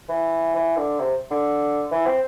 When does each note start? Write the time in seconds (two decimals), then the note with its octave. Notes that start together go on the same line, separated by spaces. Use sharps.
0.09 E3
0.55 E3
0.77 D3
1.00 C3
1.31 D3
1.91 E3
2.07 C4